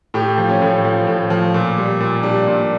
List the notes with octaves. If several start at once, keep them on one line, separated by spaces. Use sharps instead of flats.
A2 G4
F3
C#4
A2
F3
A2
F3
A#2
G3
A#2
G3 D4
A#2